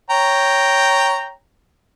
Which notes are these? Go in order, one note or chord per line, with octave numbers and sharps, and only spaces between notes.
C#5 G5 A#5